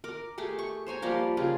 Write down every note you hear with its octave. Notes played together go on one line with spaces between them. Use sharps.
A#4 D6
A3 G4 G#4
C#6
C5 C#5 G#5 A#5
F3 G3 A#3 A#4
C#3 F4 G#4